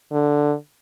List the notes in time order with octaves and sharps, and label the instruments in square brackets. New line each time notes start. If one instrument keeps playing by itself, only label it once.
[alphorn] D3